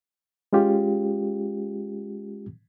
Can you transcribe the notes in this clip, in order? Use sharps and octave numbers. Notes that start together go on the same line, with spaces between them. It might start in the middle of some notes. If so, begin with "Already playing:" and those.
G#3 C#4 F4 G4